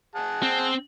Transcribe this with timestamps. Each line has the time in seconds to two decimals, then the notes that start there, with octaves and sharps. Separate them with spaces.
0.15 G#4 F#5 A5
0.43 C4